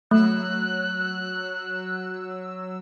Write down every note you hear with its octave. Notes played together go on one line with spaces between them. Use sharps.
F#3 A3 E6 F#6